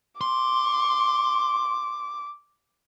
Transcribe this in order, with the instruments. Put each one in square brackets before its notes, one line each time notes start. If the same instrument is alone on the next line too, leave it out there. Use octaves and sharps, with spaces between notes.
[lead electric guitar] C6 [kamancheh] D6